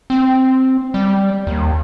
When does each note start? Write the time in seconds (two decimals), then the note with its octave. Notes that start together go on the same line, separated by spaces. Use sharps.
0.10 C4
0.94 G3
1.47 D#2